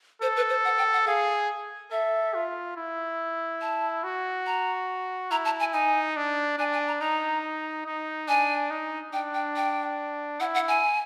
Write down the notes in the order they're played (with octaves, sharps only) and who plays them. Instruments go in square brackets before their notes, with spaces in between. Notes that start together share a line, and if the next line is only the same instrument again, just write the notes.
[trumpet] A4 [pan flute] C5
[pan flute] B4
C5
F#5
G5
F#5
[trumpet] G#4 [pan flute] F5
[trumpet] A4 [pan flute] E5
[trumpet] F4
E4
[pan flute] A5
[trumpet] F#4
[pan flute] A#5
[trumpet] E4 [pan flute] A#5
[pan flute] A5
G#5
[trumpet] D#4 [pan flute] G#5
[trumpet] D4
[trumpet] D4 [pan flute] G#5
[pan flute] G#5
A#5
[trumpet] D#4 [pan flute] A#5
[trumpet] D#4
[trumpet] D4 [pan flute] G#5
[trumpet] D#4
[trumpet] D4 [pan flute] G5
[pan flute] G5
G5
[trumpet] E4 [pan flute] F#5
[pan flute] F#5
G#5